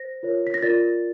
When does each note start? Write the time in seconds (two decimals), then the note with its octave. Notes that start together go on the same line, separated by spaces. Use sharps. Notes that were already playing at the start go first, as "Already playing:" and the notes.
Already playing: C5 A#6
0.23 F4 A#4 C#5
0.47 B6
0.54 A#6
0.62 F4 A#4 D5 A6